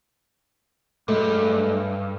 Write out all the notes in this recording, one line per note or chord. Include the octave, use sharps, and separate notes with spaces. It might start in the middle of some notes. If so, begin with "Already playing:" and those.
G2 F#3 G#3 A3